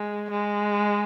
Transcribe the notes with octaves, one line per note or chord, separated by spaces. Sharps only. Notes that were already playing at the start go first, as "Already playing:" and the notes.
Already playing: G#3
G#3